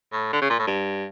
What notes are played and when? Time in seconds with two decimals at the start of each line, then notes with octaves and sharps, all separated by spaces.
0.12 A2
0.33 D3
0.41 C#3
0.50 A#2
0.59 A2
0.67 G2